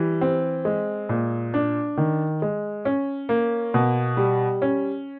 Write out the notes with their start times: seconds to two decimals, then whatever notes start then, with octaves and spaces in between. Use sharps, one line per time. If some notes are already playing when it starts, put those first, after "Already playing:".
Already playing: E3 G3
0.21 C4
0.65 G#3
1.09 A#2
1.54 D4
1.97 D#3
2.42 G#3
2.85 C#4
3.29 A#3
3.74 B2
4.17 G3
4.62 C#4